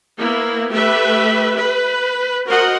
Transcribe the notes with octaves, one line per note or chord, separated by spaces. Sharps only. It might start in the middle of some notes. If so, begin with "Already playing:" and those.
A#3 B3 E4
A3 G4 B4 E5
B4
F#4 A#4 C5 D#5 F#5